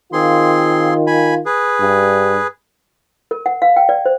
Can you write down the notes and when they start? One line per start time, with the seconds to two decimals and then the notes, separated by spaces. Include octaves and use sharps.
0.13 D#3 C4 F4 G#4 C6
1.07 G#5 B5
1.46 G#4 B4
1.81 G2
3.31 A#4
3.46 F#5
3.62 F5
3.76 G5
3.89 D5
4.05 C5